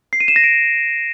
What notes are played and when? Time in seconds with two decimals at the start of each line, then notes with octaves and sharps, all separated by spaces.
0.13 C7
0.20 D#7
0.28 E7
0.36 A#6
0.44 D7